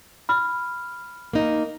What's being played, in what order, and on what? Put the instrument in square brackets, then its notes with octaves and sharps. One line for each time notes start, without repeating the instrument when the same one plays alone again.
[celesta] B5 F6
[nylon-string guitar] A#3 D#4